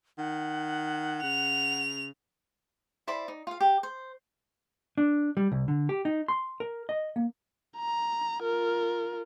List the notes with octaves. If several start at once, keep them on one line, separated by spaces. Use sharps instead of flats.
D#3 F#5
C#3 F7
E4 C5 D5 B5
D#4
F4 F5
G4
C5
D4
G3
C2
D3
G4
D#4
C6
A#4
D#5
A#3
A#5
F4 A#4